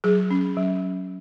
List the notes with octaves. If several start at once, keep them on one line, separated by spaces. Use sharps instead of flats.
F#3 G#4
C#4
F#3